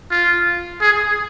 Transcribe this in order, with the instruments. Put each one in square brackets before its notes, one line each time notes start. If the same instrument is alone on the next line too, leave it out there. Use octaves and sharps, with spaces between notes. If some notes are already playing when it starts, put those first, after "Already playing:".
[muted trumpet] F4
G#4